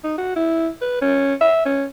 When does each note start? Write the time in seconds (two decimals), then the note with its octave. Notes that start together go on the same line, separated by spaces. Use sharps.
0.04 D#4
0.18 F#4
0.36 E4
0.81 B4
1.02 C#4
1.41 E5
1.65 C#4